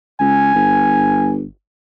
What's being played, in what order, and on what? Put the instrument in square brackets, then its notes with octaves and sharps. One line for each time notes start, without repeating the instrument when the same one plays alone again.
[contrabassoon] C#2 [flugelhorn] G#5
[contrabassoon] G1